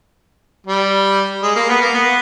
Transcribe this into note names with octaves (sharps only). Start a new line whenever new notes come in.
G3
G#3
A#3
B3
A#3
B3